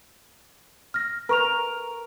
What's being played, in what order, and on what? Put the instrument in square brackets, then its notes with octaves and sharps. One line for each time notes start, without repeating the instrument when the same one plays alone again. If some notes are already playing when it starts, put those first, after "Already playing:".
[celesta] F6 A#6
[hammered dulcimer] A#4 [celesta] B4 C#6 F7